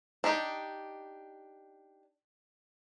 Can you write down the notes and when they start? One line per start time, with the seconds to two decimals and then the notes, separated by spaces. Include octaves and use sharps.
0.24 D4 D#4 G4